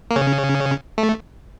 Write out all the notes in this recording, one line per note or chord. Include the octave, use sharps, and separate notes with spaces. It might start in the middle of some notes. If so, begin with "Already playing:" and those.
A#3
C#3 C#4
A3